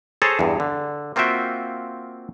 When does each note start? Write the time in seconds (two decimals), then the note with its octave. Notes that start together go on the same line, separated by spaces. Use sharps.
0.22 G#4 A4 C5 C#5 A5 A#5
0.39 E2 G2
0.60 D3
1.16 A#3 C4 F4 F#4 E5 G5